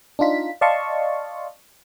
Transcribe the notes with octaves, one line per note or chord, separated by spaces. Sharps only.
D4 D#4 F4 B6
D5 D#5 F5 A5 C6 C#6